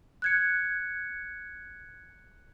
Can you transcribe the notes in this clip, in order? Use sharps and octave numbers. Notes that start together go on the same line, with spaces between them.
F#6 G#6 C#7